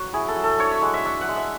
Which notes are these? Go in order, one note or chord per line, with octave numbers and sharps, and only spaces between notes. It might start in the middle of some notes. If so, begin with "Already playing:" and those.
Already playing: F#3 F#4
E4 G#4
A4
F#3
A4
D4 C#5
E5
G#3 F#5
E5
D4 E5
F#5
G#3
E5